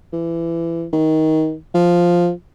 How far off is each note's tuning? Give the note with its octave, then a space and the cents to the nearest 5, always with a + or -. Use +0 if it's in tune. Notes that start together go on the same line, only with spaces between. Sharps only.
E3 +20
D#3 +20
F3 +0